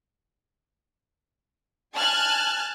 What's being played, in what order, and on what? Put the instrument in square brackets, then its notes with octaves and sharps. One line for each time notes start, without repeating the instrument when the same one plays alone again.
[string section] G#5 A5 F6 F#6 G#6